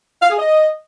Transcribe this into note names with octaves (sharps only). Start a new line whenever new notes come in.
F5
G#4
D#5